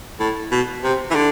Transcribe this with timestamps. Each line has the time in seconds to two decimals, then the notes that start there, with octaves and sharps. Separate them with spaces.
0.20 A2
0.52 B2
0.84 C3
1.10 E3
1.15 D3